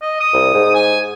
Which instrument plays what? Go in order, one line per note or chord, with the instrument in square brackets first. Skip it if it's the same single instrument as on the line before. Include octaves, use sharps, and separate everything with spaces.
[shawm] D#5
D#6
[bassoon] C2
G#2
[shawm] G#5